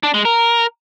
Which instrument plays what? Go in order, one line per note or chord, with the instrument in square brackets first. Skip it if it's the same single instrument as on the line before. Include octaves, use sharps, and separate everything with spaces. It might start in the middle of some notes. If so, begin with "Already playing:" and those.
[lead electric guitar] D4
G#3
A#4